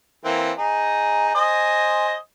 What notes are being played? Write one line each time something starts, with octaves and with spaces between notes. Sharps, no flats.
E3 A#3 C4
D#4 G#4
C5 D#5 G#5